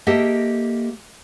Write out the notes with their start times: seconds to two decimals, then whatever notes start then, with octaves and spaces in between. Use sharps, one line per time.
0.07 A#3 G4 A4 D#5 E5